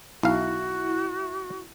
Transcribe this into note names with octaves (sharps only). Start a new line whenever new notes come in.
B1 E4 F#4 F5